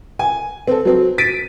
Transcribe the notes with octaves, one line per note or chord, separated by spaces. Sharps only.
G#5
C4 A4
F#3 C4
A6 B6 D7 D#7